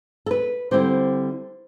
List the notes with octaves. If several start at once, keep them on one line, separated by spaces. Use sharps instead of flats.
A4
B4
D3 G3 C4 E4 C5